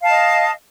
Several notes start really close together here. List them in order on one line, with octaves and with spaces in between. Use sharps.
F5 A5 D#5